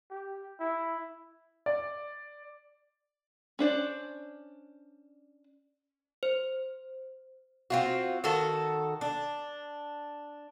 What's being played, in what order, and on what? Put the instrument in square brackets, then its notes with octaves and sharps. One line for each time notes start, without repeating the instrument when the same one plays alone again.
[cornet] G4
E4
[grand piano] D5
[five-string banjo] C#4 D4 C5 D5
[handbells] C5
[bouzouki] C4 F4 F#4
D#3 F#4 A4
D4